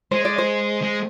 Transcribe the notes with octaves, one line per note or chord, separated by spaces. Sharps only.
G#3 C5
D5
C5
G#3